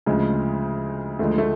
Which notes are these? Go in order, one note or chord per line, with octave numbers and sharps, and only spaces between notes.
D2 C#3 F3 G#3
D2 D3 F3 G#3 A3
A3